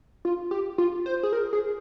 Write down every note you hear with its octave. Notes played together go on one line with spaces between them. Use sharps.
F4
G4
F4
C5
G#4
A#4
G#4